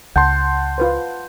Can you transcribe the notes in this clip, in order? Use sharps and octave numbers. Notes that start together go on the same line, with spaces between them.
C#2 F#5 A5 C6 G6
F4 B4 C5